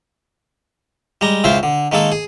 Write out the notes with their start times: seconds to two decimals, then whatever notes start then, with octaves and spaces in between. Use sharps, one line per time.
1.21 G3 G#3 A#5
1.44 C#2 C#3 E4 F4 C5 F5
1.63 D3
1.92 D#3 G#3 A#3 A4
2.12 G#4